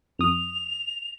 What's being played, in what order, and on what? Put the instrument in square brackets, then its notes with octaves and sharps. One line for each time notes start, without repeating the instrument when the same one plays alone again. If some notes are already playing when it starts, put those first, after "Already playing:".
[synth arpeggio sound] F2 D#6 [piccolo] F7